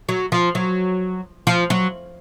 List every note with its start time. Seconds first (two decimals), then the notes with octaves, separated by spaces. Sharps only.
0.09 F#3
0.32 F3
0.55 F#3
1.47 F3
1.70 F#3